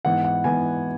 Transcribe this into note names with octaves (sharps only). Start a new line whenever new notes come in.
G#2 E3 B3 F#5
F#5
G#2 E3 B3 G#5